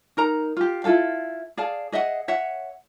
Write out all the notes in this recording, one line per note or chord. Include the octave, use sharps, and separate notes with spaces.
D#4 A#4 A#5
F4 G4
E4 F4 A4 F5
G#4 D5 F5 A5
G#4 D#5 E5 F#5
C#5 E5 F#5